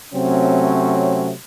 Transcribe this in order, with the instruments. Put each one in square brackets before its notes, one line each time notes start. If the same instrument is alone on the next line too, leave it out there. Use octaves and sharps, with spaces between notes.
[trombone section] C3 F#3 A3 C4 C#4